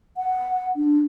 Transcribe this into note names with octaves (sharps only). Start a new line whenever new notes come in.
F#5
D4